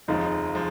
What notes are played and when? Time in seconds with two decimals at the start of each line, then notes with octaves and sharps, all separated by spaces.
0.08 F1 D#2 C#3 F3 G#3 D#4
0.55 F3 G#3